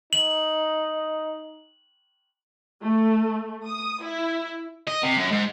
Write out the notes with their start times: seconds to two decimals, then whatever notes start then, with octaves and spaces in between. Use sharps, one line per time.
0.13 D#4 F#7
2.83 A3
3.65 D#6
4.04 E4
4.87 D#5
5.03 C3
5.16 F#2
5.31 G#2